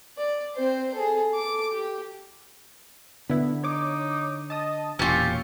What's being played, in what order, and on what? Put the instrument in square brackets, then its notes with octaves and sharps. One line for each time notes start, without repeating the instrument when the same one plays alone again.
[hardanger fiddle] D5
C4 C5
G#4 A4
A4 D6
G4
[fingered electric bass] D3 [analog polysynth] B3 E4
[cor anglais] D#4 [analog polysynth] C#5 D6
[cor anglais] D#5 [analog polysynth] A5 D#6
[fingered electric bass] E1 A#2 [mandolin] C#4 F4 [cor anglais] G4 [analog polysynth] E6 C#7